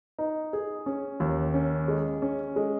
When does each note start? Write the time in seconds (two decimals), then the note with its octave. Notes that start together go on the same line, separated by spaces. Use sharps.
0.19 D#4
0.53 G#4
0.86 C#4
1.20 D#2
1.54 C#4
1.88 G#3
2.22 C#4
2.56 G#3